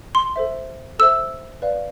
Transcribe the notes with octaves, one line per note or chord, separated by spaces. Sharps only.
C6
A4 C5 E5
A4 C5 E5 E6
B4 D5 F5